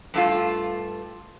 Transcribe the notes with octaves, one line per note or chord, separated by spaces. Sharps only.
G2 A3 F4